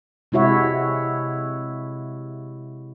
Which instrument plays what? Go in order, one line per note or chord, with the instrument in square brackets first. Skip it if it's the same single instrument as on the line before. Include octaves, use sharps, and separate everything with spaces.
[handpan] C3 G#3 E4 F#4 C#5 E5